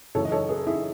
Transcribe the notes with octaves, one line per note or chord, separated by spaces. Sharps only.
F#2 C#3 E3 A3 A4 C#5
D#5
A4 C#5
G#4 B4
E4 G#4